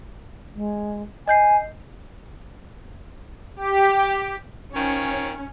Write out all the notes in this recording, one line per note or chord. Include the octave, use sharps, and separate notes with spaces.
G#3
D#5 G#5 G6 C7
G4
D#3 F3 C#4 C#5